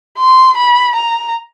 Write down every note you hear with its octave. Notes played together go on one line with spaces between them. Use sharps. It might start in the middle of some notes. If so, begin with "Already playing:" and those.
C6
B5
A#5